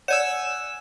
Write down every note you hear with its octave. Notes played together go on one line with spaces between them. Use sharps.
C#5 D5 F#5 G#5 E6 E7